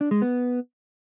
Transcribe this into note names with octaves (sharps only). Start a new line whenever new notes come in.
D4
G#3
B3